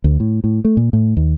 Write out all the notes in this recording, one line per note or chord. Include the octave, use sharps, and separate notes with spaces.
D2
A2
A2
A3
A#2
A2
D#2